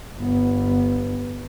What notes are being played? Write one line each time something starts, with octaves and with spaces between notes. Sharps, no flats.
G1 B3